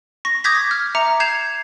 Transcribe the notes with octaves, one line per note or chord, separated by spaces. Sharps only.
C#6 A#6
D6 D#6 G6 G#6 A#6 B6
F6
E5 A#5 D6 C#7
G6 G#6 C7 E7 F7